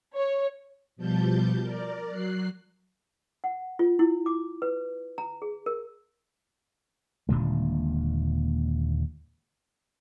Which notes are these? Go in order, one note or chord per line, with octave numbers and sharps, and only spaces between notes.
C#5
B2 F3 G3 A5 G6
A#4 D5
F#3 F#6 C7
F#5
F4
E4
D6
B4
A#5
G#4
A#4
D#1 A#2 D3 G#3